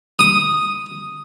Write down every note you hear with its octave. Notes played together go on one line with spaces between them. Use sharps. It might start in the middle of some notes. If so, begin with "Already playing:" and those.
D#6